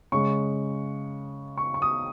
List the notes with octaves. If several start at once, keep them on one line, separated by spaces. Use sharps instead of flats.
C#3 G#3 C#6
C#6
C#6
D#6